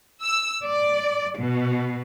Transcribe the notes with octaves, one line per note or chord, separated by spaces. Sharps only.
E6
D5
B2